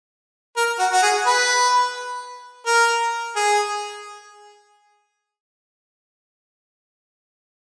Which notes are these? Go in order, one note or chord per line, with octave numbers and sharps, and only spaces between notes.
A#4
F#4
F#4
G#4
B4
A#4
G#4